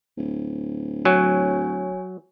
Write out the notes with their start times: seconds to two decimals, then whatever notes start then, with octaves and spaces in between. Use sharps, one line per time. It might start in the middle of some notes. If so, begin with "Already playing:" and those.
0.17 D1
1.05 F#3 C#5 G#5